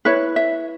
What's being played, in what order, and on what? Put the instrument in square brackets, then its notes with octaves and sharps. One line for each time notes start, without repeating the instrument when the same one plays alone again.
[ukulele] E4 B4 C#5
E5